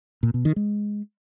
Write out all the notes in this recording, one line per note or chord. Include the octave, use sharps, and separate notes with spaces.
A#2
B2
D#3
G#3